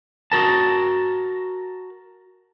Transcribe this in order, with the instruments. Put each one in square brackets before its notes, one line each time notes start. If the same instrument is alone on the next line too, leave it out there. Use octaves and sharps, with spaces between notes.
[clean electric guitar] F#4 A#4 A5